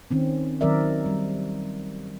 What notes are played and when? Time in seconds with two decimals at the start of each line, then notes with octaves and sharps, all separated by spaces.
0.11 D#3 C4 C#4
0.61 D#3 F#3 C4 A#4 D5 E5
1.06 G3